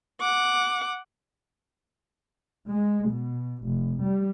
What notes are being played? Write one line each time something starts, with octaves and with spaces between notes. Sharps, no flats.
F#5 D6
G#3
B2
F1
G3